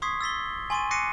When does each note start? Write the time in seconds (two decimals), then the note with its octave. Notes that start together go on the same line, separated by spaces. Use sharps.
0.02 C6 C#6 D#6 G#6 B6 C7
0.21 E6 A6 B6 G7
0.70 G#5 C6 C#6 A6 D#7
0.91 D6 F#6 A#6 C7 C#7 D#7